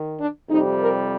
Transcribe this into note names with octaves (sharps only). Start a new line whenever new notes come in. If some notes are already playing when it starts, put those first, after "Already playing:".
Already playing: D#3
D4
F2 C3 G3 D#4
A#4